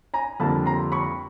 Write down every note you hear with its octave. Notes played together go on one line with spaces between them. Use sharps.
G#5 A#5
F2 D3 G3 A#3 D4 A5 B5
A#5 C6
B5 C#6